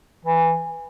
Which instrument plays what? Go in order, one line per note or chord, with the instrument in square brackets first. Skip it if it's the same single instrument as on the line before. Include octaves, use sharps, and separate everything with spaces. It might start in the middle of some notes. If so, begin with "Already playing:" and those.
[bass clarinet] E3